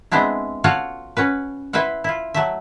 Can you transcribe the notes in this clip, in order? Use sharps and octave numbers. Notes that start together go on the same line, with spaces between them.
G#3 B3 C4 D4 E4
F4 F#4 A4 C#5 F5 F#5
C#4 F#4 B4
E4 B4 C5 E5 F#5
E4 F4
F#3 A3 E5